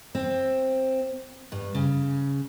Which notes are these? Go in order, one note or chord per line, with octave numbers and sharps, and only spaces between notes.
C4
G2
C#3